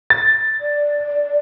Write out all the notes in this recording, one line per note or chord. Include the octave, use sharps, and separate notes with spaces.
A6
D5